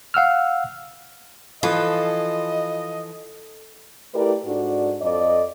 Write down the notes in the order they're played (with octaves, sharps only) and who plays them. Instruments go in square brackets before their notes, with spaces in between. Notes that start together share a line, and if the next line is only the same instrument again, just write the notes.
[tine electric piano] F5 F#5 E6 F6
[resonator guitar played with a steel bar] E3 F3 F4 [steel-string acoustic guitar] A4 [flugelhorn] D#5
[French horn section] A3 E4 G4 A#4 B4 D5
G#2 D4 F#4 A4 D5
F2 A4 D5 D#5